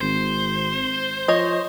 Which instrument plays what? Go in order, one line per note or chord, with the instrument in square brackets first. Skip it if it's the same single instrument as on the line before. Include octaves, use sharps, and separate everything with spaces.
[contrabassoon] G#1 [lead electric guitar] C5
[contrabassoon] F3 [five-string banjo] C#5 D#5